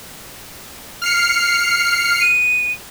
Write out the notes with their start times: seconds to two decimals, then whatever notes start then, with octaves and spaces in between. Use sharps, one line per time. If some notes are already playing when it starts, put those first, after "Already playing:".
1.02 F6 C7 C#7
2.21 D#7